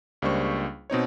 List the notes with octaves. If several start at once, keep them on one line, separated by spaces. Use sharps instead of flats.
C#2 G3 A#3 D4 C5 C#6
B2 C4 D#4 C#5